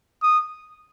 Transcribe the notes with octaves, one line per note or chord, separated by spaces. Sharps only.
D#6